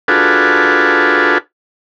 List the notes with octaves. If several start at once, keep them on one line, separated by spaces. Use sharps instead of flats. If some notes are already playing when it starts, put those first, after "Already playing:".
D4 F4 F#4 G#4 A4 B4